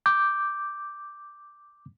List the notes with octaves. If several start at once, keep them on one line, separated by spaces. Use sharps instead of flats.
D6 G6